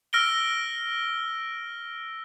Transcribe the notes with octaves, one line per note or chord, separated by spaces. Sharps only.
E6 F6 A#6 D7 G7